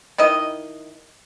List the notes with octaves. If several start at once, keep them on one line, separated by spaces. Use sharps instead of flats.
D#3 E4 D#5